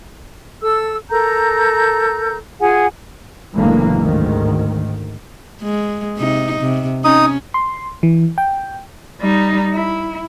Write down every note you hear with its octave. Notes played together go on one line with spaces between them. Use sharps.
A4 E6
A4 A#4 A#5 G6
F4 G#4 F#5 G#5
F#1 A2 D3 E3 G#3 A#3
G#1 D2 G#2 D#3
G#3
C3 D#4
C3
C#4 D#4 D#6
C6
E3
G5
G3 D#4
E4